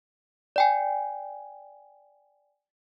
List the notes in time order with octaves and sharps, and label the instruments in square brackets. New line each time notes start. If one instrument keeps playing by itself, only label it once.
[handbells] D5 G5 G#5